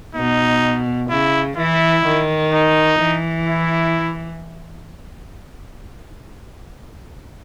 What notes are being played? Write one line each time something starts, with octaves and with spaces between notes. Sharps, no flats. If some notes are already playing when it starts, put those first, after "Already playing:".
B2 D#4
C#3 E4
E3 E4
D#3
D#4
E3
E4